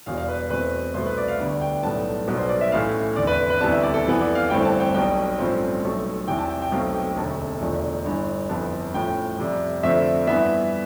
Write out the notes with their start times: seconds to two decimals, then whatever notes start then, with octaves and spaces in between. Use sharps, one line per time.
0.06 E1 E2 B2 G3 F5
0.17 F5
0.28 B4
0.50 E2 B2 A3 C4 B4
0.94 C2 B2 A3 C5
1.06 B4
1.17 D5
1.28 F5
1.40 D2 D3 G3 B3
1.61 G5
1.83 B1 A2 G3 B3 A5
2.28 B1 B2 G3 B3
2.37 C5
2.49 D5
2.61 E5
2.72 A1 A2 E3 A3 F5
3.16 F1 E2 D3 D5
3.27 B4
3.50 B4
3.61 D2 C3 E3 G3 B3 A5
3.73 E5
3.83 D5
3.94 A4
4.05 F1 F2 E3 B3
4.21 D5
4.35 F5
4.50 G1 G2 E3 A3 C4 G5
4.65 A5
4.80 G5
4.94 B1 B2 G3 G5
5.39 A1 G2 F3 A3 C4
5.83 B1 B2 A3
6.28 E2 C3 E3 G5
6.39 A5
6.50 G5
6.61 G5
6.71 B1 B2 A3 C4 F5
6.95 G5
7.16 E1 D2 C3 A5
7.60 E1 E2 D3 F3 A3
8.05 G1 G2 E3
8.49 G1 F2 E3 B3 A5
8.94 A1 A2 F3 G5
9.38 F2 C3 G3
9.83 F2 D3 F3 A3 C4 E5
10.27 G2 E3 B3 E5